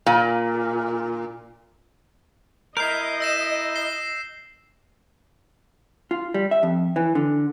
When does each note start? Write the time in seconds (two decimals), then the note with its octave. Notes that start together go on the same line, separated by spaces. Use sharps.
0.06 A#2
2.77 E4 A#4 D#5 G6 C7
3.20 E6 A#6 E7
3.76 C7 G7
6.11 F4
6.34 G3
6.51 E5
6.63 F2
6.96 E3
7.15 D3